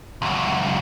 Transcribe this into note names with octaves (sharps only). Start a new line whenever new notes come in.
C#2 F#2